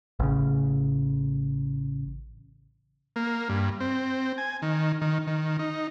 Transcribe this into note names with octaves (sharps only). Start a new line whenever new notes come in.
A1 C#3
A#3
G2
C4
G#5
D#3
D#3
D#3
D#4